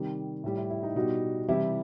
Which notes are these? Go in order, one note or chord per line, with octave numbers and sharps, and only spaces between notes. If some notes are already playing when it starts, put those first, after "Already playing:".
Already playing: C3 D#3 G3
A2 G3
E4
E4
D#4
B2 G3 D#4 F#4
C3 E3 G3 E4 G4